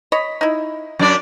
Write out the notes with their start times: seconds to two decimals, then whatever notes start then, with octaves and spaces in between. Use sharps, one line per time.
0.12 C#5 D#5 B5
0.41 D#4 E4
0.99 F#2 D4 D5